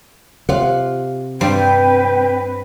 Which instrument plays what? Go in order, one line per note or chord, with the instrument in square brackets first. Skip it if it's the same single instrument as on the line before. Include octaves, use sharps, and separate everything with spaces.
[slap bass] C3 [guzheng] F4 F#5
[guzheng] G2 G3 C5 [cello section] C4 B4 [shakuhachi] G5